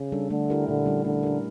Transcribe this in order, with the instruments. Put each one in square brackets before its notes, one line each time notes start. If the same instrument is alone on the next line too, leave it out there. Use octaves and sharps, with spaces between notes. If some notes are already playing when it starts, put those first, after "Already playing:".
Already playing: [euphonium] C#3
[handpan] G3 D4 A4
[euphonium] D3 [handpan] A3
[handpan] E4 G4 A#4
[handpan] A#2 [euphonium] D3
[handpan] G3 C#4 E4
[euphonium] D3 [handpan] A3
[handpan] D4 G4 A#4